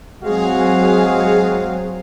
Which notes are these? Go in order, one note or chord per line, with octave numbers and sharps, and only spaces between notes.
F#3 G#3 C4 F#4 G#4 F5